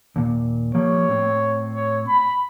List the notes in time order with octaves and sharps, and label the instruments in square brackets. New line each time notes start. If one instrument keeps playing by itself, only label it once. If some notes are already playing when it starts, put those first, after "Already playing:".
[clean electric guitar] D#2 A#2
[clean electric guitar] F3 G3 A#3 [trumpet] C#5
[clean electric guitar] A2 C4
[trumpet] C#5
B5